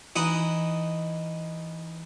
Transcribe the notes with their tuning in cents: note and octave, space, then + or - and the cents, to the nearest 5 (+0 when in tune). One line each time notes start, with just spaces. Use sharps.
E3 +0 D#4 +0 F#5 +0